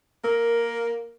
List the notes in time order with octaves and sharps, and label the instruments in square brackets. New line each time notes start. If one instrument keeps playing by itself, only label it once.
[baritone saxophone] A#3 [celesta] A#4